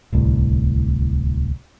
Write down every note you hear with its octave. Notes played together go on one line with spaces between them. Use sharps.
D1 C2 A2